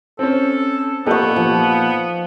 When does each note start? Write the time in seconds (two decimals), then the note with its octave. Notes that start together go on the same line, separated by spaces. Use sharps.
0.19 C4 C#4 A4
1.06 A#2 B3 G4 A4 D#5 C#6
1.36 F3